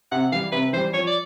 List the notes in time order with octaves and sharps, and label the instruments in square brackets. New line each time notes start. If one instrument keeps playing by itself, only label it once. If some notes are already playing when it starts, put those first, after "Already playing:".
[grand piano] C3 [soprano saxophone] F#5
[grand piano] E3 G3 [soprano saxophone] F5
[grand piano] C3 [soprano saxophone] B4
[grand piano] E3 [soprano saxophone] C5
[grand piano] G3
[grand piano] F3 [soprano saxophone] C#5
[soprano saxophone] D5